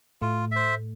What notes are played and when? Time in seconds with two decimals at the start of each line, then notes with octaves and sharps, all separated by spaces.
0.22 A2 A3 F4
0.51 C5 E5